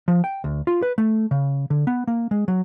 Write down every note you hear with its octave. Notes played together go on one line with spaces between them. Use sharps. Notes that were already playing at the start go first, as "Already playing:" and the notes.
F3
G5
D2
F4
B4
A3
C#3
D3
B3
A#3
G#3
F#3